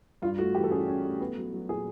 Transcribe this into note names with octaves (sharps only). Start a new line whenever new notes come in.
G2 F4
A3 F#4
E3 G4
A4
C#4 G#4
C#4
A3
B3
F#3
F#3
A#2 G#4